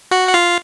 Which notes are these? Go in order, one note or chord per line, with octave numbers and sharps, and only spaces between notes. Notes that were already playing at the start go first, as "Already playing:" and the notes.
F#4 F#5
F#5
F4 F5